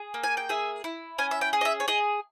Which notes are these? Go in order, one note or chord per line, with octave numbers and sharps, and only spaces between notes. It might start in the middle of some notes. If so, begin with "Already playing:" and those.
Already playing: G#4
A#3
G#5
G5
G#4 E5
E4
C#4 G#5
E5
G5
G#4
D#5
E5
C#5
G#4 D#5